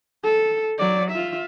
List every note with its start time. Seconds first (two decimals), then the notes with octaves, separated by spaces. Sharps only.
0.24 A4
0.78 F#3 D5
1.11 F4 E5